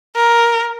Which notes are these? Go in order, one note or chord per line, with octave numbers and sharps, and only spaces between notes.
A#4